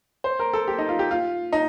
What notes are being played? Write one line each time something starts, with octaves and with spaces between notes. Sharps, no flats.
C5
A#4
A4
G4
D#4
F4
G4
F4
D#4